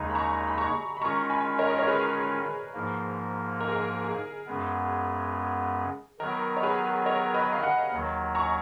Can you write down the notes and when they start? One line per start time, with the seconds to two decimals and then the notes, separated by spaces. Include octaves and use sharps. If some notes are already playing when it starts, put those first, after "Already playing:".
Already playing: D#2 C#3 G#3 D#4 G#5 A#5 B5 C#6
0.10 B5
0.15 A#5 C#6
0.47 B5
0.58 A#5 C#6
0.97 B5
1.02 D#3 G#3 C#4 F4 A#5 C#6
1.30 G#5 B5
1.59 A#4 C#5
1.70 D#5
1.79 C#5
1.87 G#4 B4
2.74 G#2 F3 A#3
3.61 A#4
3.68 G#4
3.76 A#4
4.04 G#4
4.47 F#2 C#3 G#3 B3
6.19 D#3 F#3 B3 A#4
6.57 C#5
6.63 G#4 B4
7.06 A#4 C#5
7.34 B4 D#5
7.53 F5
7.63 D#5 F#5
7.92 D#2 D#3 F#3
8.35 A#5 C#6